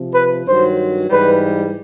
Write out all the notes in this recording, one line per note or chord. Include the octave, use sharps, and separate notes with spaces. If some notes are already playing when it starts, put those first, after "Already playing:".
Already playing: C3 F3
B4
G2 D#3 F#3 C5
G#2 E3 G3 B4